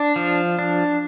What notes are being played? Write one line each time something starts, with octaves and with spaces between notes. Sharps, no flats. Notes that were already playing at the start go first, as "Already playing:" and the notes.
Already playing: D4
F3
D4